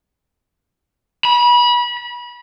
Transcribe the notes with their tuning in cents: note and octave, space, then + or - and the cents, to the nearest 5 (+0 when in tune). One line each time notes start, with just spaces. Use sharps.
B5 -30